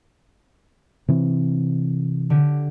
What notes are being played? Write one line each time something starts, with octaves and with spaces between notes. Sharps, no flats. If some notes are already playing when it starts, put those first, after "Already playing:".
C3 E3 C4
D3 G4